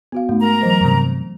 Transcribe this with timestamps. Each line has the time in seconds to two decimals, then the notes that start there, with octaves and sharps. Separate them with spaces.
0.12 B3 F#4 F5
0.29 G#2 A3 D#4
0.40 A#4 A#5
0.62 E3 F#3 C5
0.81 G2 C3